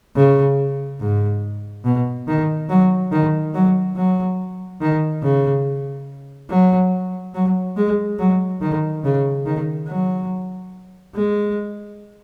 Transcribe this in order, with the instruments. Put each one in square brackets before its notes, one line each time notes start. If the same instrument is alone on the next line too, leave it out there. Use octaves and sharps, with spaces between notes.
[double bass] C#3
G#2
B2
D#3
F#3
D#3
F#3
F#3
D#3
C#3
F#3
F#3
G#3
F#3
D#3
C#3
D#3
F#3
G#3